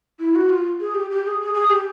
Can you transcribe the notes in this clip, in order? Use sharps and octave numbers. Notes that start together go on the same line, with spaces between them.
E4
F#4
F4
G#4
G4
G4
G#4
G#4
G#4
G4